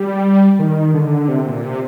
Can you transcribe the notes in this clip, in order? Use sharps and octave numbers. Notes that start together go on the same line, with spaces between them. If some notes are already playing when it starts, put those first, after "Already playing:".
Already playing: G3
D#3
D3
C3
A#2
C3